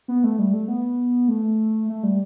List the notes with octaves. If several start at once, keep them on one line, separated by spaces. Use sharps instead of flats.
B3
A3
G3
A3
B3
A3
A3
G3